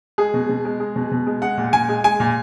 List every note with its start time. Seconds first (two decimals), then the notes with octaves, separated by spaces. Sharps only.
0.18 G#3 G#4
0.34 B2
0.49 B2
0.65 G#3
0.80 G#3
0.96 B2
1.11 B2
1.27 G#3
1.42 G#3 F#5
1.57 A#2
1.73 A#2 G#5
1.89 G#3
2.04 G#3 G#5
2.20 A#2